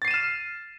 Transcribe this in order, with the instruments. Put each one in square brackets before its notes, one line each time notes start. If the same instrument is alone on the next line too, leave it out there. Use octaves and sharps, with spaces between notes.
[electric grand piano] A6
C7
D#7
E7
F6